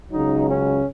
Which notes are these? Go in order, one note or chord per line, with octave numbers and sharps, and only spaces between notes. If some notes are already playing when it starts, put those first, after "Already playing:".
C#2 C#3 F#3 D#4
C#4